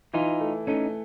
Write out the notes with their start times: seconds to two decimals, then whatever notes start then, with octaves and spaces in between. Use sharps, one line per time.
0.13 E3 D#4 F4
0.40 A3
0.67 A3 C#4 D#4